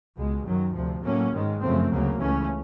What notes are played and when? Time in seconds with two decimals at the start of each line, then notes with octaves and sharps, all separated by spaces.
0.17 C#2 B2 G#3
0.46 F#2 D#3 F#3
0.74 D2 C3 F3
1.03 A2 F#3 A#3 C#4
1.33 G#2 D#3 G#3
1.62 F#2 C#3 F3 A3 C4
1.91 D2 C#3 F#3 A#3
2.20 C#2 C#3 E3 A3 C#4